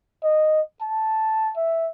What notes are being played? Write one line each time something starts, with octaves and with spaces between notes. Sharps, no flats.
D#5
A5
E5